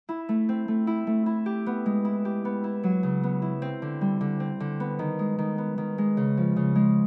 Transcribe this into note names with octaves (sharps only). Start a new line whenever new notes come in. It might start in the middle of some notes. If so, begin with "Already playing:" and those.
E4
A3
C4
A3
E4
A3
E4
G4
B3
G#3
E4
G4
B3
E4
F#3
C#3
B3
E4
C4
D3
G3
D3
C4
D3
B3
D#3
G#3
D#3
B3
D#3
G#3
C#3
F3
C#3
G#3